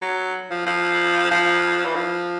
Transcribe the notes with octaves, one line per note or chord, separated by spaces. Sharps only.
F#3
F3
F3
F3
E3
F3